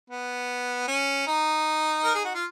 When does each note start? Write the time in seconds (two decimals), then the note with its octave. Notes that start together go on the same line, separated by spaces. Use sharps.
0.10 B3
0.88 C#4
1.27 D#4
2.04 A#4
2.14 G#4
2.25 F#4
2.34 F4